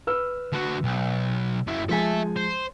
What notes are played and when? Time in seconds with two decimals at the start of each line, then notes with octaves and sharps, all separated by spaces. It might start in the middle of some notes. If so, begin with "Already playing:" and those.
0.07 B4 E6 F6
0.53 D3 F#4
0.84 B1
1.67 F#2 E4
1.89 F3 G#3 A4 E5 G#5
2.37 C5